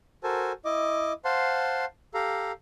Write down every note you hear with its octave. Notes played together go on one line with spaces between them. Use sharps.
F#4 A4 A#4 C5 G#5 A5
E4 D#5 D6
C5 F5 F#5 A5 C6
G4 A4 F5 A#5